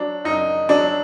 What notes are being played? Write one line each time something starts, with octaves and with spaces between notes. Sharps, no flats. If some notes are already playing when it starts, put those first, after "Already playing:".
Already playing: F#3 D4
F#2 D#4
F#3 D4